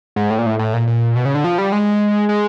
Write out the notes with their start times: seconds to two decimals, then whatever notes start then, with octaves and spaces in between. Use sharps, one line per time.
0.16 G#2
0.30 A2
0.39 A#2
0.46 A2
0.59 A2
0.73 A#2
0.87 A#2
1.16 B2
1.25 C#3
1.35 D3
1.44 F3
1.58 G3
1.72 G#3
2.29 G#3